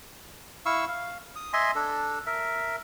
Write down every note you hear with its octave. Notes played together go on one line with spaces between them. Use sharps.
E4 F5 C#6 E6
F5
D#6
D#5 E5 G#5 C6
D4 A4
A#4 E5